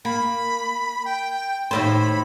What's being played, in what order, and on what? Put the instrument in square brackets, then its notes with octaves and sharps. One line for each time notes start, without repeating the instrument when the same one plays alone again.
[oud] A#3 [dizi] B5
[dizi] G5
[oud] D#2 A2 C5 [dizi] B5